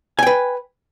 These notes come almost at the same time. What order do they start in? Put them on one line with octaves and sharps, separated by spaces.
G#5 G5 B4